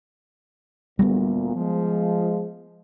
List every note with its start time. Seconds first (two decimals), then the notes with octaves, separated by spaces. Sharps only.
0.99 D2 A#2 G3 A#3 B3
1.56 F3 G#3